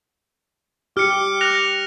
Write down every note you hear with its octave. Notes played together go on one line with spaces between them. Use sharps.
G4 D6 F6 C#7
F#6 A#6 F7